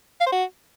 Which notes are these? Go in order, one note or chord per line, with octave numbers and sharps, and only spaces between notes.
F5
C5
F#4